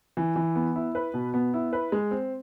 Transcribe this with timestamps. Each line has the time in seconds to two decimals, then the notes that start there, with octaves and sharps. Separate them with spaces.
0.17 E3
0.36 E3
0.55 B3
0.76 E4
0.95 B4
1.14 B2
1.34 B3
1.54 E4
1.73 B4
1.92 G#3
2.11 C4